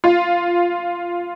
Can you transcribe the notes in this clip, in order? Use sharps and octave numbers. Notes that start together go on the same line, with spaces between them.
F4